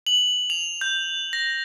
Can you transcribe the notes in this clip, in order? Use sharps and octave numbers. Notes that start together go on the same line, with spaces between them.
F#7
F7
G6
A#6